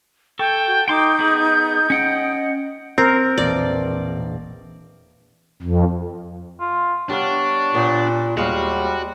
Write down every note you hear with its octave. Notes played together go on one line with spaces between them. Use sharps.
A4 G5 C#6
F#4
D#4 G5 C6 D6 G6
B3 G#4
C#4 D#5 F#5 G5
C4 A#4
E1 A#1 D5
F2
F4
G3 B3 D4 C#5 F5
A#2 B3 C5
D#2 G3 G#3 F#4 F5